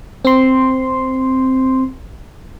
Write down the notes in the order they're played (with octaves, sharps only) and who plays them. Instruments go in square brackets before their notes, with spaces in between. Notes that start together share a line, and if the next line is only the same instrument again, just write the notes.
[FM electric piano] C4 C6